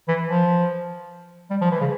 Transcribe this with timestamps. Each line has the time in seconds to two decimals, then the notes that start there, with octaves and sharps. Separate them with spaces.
0.08 E3
0.28 F3
1.50 G3
1.61 F3
1.71 E3
1.81 C#3